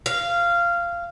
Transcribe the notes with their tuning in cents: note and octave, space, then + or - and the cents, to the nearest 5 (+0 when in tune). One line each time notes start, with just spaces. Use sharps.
F5 -15